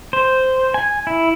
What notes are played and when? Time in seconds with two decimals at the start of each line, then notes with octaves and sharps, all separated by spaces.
0.13 C5
0.74 G#5
1.07 E4